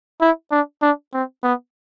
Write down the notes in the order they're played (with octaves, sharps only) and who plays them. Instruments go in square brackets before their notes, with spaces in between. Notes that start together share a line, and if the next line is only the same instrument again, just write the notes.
[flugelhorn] E4
D4
D4
C4
B3